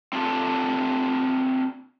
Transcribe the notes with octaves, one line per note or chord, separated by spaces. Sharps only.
C4 D4 F4 G4 A4